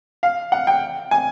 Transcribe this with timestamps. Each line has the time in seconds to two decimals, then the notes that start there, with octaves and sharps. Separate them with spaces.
0.23 F5
0.52 F#5
0.67 G5
1.11 G#5